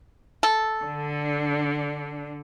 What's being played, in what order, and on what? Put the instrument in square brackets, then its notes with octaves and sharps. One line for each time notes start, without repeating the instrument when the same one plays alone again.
[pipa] A4
[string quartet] D3 D4